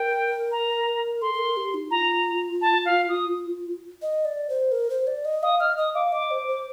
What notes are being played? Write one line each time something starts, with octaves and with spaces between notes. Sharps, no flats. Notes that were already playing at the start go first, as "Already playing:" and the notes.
Already playing: A#4 G5
A#5
A4 C6
A4
A#4
G4
D#4
F4 A#5
A5
F5
D#6
D#5
D5
C5
A#4
C5
D5
D#5
F5 D#6
D#5 F6
D#5 D#6
F5 D6
D#5 D6
C5
C5